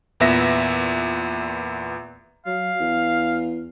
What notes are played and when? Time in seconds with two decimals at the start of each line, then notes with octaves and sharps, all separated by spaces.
0.20 E2 A#2 B3 E5 A#6
2.47 F#3 F5
2.80 E2